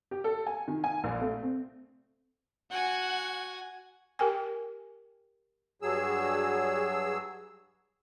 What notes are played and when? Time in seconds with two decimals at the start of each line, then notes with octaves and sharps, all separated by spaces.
0.11 G4
0.24 A4
0.46 G#5
0.68 D#3
0.84 G#5
1.04 A#1
1.21 A3
1.43 C4
2.71 F#4 F#5 G#5
4.19 G4 A#4 G5 G#5
5.82 G2 F#3 G#4 E6